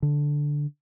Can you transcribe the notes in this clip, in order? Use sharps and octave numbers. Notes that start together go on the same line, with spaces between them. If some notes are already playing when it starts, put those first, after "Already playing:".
D3